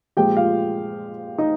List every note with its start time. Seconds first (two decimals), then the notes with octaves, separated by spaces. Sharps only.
0.17 A#2 F3 G#3 G4 G5
0.37 F4 F5
1.38 D#4 D#5